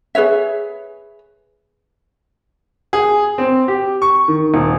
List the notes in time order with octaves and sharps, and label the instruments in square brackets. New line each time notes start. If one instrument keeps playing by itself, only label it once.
[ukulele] G#4 B4 C#5 E5
[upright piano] G#4
C4
G4
C#6
D#3
D#1